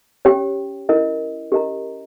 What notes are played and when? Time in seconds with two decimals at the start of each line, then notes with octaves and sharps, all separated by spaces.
0.25 C#4 G4 C#5 G5
0.89 C#4 E4 A#4 D#5
1.52 C#4 G4 A#4 D#5 A#5